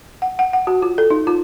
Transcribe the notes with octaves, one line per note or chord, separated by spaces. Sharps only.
F#5
F#5
F#5
F#4
F4
A4
D#4
F4